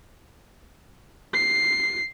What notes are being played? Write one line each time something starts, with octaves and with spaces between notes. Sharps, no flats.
C7